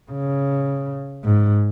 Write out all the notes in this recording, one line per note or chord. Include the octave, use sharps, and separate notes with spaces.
C#3
G#2